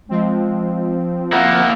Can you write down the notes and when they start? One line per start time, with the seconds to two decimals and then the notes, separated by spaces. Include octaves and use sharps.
0.09 F3 G#3 C4
1.32 A#3 E4 F#5